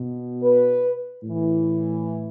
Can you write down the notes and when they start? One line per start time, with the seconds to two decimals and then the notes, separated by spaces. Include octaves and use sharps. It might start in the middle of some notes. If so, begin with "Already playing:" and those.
Already playing: B2
0.43 B4
1.23 A2 E3